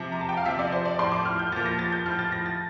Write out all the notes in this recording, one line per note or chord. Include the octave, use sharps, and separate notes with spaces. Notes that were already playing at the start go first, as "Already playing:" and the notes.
Already playing: C3 F3
A#5
A5
G5
F5
C3 F3 E5
D5
C5
D5
A2 F3 C6
D6
F6
G6
A#2 F3 A6
A#6
A6
G6
A2 F3 F6
A6
A#6
A6